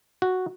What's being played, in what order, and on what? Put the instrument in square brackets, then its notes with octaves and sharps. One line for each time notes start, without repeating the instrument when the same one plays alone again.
[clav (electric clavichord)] F#4